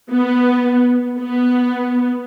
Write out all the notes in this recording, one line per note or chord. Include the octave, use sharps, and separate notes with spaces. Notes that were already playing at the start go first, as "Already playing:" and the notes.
B3
B3